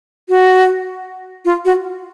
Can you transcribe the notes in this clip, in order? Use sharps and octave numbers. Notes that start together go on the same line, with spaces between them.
F#4
F4
F#4